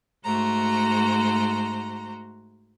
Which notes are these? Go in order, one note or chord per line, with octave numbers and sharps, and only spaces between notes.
G#2 A3 F#4 C5 A#5